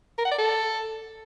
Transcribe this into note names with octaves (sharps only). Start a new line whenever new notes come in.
A#4
F#5
D5
A4